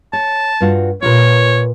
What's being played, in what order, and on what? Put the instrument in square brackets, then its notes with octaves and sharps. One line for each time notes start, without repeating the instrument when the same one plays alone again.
[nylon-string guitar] C#5 [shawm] A5
[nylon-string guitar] G2 F4 F#4
[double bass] A#2 [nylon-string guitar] F4 A#4 B4 [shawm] C#5